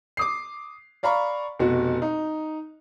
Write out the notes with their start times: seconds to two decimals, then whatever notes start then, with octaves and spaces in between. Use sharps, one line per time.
0.17 D6 D#6 C7
1.03 D5 F5 A#5 B5 C#6
1.59 F1 B2 F#4
2.02 D#4